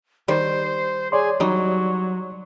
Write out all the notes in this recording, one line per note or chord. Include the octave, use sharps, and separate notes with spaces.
D#3 G3 C5
G#4 C#5 D5 C6
F#3 G3 D#4